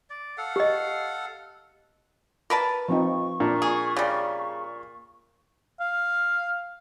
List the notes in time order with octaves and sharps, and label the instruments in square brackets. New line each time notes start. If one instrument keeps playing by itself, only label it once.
[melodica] D5
A4 F5 F#5
[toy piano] G4 D#5
[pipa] A#4 B4 A5
[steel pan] F3 C4 D#4 [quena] C#6
[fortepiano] A#2 [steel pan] D4
[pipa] G#4
C#3 G3
[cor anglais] F5